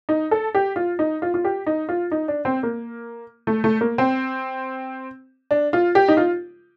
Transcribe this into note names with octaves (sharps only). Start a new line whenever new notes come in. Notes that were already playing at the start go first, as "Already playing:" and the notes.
D#4
A4
G4
F4
D#4
F4
F4
G4
D#4
F4
D#4
D4
C4
A#3
A3
A3
A#3
C4
D4
F4
G4
D#4
F4